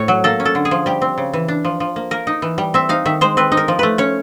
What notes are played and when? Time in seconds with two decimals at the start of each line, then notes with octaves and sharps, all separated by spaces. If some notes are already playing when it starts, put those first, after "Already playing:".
Already playing: A2 C#5
0.08 F#3
0.24 A#3 A4
0.40 C#4
0.45 A4
0.55 D3
0.65 G#4
0.71 F3
0.86 G3 G4
1.02 C4
1.18 C#3
1.33 E3
1.48 D4
1.65 F3
1.80 F3
1.96 A#3
2.11 A#3 A#4
2.27 D#4
2.42 E3
2.58 G3
2.74 C4 E5
2.89 D#4 F5
3.06 D#3 E5
3.21 G#3 C5
3.37 C4 B4
3.52 D#4
3.57 A#4
3.68 F3
3.79 A3 B4
3.98 C#4 C#5